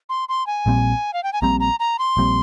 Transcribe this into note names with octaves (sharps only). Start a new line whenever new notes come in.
C6
C6
G#5
A#1 A#2 G3 C4
F5
G5
G#5
A#1 A#2 G3 C4 A#5
A#5
A#5
C6
A#1 A#2 G3 C4